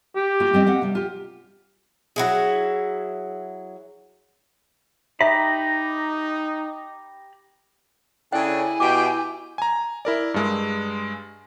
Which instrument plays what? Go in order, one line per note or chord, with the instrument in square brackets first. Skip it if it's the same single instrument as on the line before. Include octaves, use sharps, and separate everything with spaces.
[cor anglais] G4
[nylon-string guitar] A#3 F4 F#4
G3 C4 D#5
C4 F5 F#5
C3 G3
F4 G4
[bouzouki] F#3 E4 G#4
[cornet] D#4 [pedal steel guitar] G4 A#5 B5 [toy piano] E5
[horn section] C#3 D4 A4 [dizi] E4 [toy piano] G5 [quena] G#5
[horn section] B2 G4 G5 [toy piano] D6
[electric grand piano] G#5 A#5
E4 A#4 D5
G2 G#3